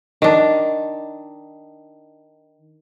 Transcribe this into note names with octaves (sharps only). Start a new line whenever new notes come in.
D#3 D4